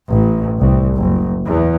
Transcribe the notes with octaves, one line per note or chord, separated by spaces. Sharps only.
A1
C2
F#1
E2